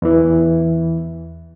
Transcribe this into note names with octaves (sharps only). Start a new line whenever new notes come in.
E2 E3